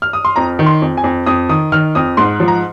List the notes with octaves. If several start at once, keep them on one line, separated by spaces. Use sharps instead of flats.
F6
D#6
C6
F2 A#5
D#3
C6
F2
G#5
F2
F2 D#6
D#3 D#6
D#3 F6
F2 D#6
G#2 C6
F3
A#5